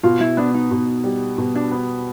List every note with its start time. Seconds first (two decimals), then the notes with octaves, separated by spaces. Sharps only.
0.03 B2 F4
0.20 E4
0.37 B3 D4
0.54 D#4
0.71 B2
1.04 G3
1.38 B2
1.55 D4
1.71 B3